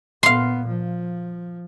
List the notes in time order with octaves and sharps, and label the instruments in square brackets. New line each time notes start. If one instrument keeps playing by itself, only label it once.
[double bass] A#2 B3 [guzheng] F5 C6
[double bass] F3